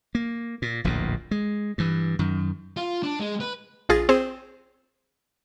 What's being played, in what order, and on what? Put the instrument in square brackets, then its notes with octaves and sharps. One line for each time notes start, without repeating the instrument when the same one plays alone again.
[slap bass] A#3
A#2
D1 A#1 E2 A#2
G#3
G2 E3
F#2 D#3
[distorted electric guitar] F4
D4
G#3
B4
[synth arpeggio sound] A#1 F4 G#4 A6 A#6
C4 G#4 C5